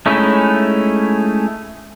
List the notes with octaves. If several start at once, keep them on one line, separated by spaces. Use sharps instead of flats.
G#3 A3 C#4 D#4 E4